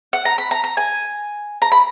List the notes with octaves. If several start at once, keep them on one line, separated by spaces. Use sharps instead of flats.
F#5
A#5
B5
A#5
A#5
G#5
A#5
B5